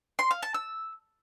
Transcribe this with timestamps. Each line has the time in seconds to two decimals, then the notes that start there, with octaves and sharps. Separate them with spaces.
0.19 C6
0.31 F5
0.43 A5
0.54 E6